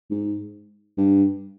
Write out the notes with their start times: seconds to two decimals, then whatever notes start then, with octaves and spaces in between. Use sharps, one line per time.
0.11 G#2
0.98 G2